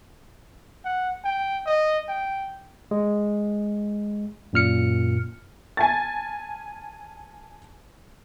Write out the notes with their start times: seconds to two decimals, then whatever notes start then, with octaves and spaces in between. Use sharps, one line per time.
0.85 F#5
1.25 G5
1.66 D#5
2.09 G5
2.91 G#3
4.53 F#2 A#2 F6 C#7
5.77 G#5 A5 A6